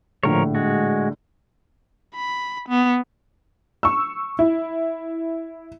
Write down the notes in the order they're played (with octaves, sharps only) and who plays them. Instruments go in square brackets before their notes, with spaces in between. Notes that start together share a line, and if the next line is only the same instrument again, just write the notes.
[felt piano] A#1 A2 D3 [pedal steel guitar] F3 A#4 C#5
[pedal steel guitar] G#3 F#4
[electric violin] B5
B3
[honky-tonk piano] C#6 E6
E4